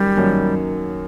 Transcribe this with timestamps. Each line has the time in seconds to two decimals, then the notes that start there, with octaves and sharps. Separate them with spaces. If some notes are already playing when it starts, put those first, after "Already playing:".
Already playing: F#2 D#3 G3
0.17 F#2 D#3 F#3 A#3